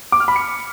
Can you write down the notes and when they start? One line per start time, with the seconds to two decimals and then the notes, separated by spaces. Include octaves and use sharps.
0.12 D6
0.20 F6
0.28 B5
0.36 C#7